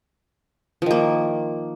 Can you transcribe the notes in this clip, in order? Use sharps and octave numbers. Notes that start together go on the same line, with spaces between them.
D#3 F3 A#3